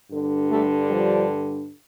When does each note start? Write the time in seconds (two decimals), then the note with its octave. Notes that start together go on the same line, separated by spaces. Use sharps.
0.10 G2 D3
0.50 G3 A3
0.89 F3 G3